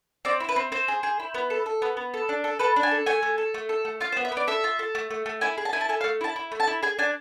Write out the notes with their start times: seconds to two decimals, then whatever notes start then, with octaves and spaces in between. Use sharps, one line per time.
0.25 C4 D5
0.40 E4
0.49 B4
0.56 C4
0.72 C4 C5
0.88 G#4
1.03 G#4
1.20 E4
1.34 B3
1.50 A4
1.66 A4
1.82 B3
1.97 B3
2.14 A4
2.29 D4
2.44 A4
2.59 A4 B4
2.76 D4
2.83 G#5
2.91 A4
3.06 A3 G#5
3.23 A3
3.38 A4
3.54 A3
3.69 A4
3.85 A3
4.01 F4 F5
4.12 C5
4.17 B3
4.25 E5
4.32 B3
4.37 D5
4.47 A4 E5
4.64 F4
4.79 A4
4.95 A3
5.11 A3
5.26 A3
5.41 E4 G#5
5.58 G#4
5.65 A5
5.73 E4 G#5
5.81 A5
5.89 A4 G#5
6.01 F5
6.04 A3
6.21 E4 A5
6.36 E4
6.52 A3
6.60 A5
6.67 E4
6.82 G#4 G#5
6.99 D4 G#5